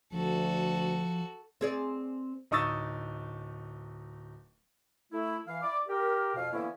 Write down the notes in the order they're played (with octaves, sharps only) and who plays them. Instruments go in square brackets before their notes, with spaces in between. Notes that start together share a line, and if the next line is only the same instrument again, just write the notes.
[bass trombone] D2 [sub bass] F3 [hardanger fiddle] F#4 A4
[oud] C4 G#4 D5
[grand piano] D1 D#4 C#6 D#6 E6 A6
[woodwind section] A3 E4
E3 F5
E4 D5 D6
G4 A#4
F2 B2 F5
D3 E3 A#3 B3 C#4 E4